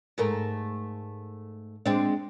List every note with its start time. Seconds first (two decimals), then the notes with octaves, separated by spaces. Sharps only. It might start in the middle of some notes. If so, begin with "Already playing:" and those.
0.18 G#2 A3 A#4
1.86 G#3 C4 D4